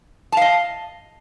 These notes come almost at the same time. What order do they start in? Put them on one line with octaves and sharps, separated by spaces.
A5 F5 D#5